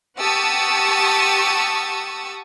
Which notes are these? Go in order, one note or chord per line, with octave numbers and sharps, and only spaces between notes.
G4 F#5 A5 C#6 D#6 E6